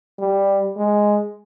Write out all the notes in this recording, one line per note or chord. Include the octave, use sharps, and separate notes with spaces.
G3
G#3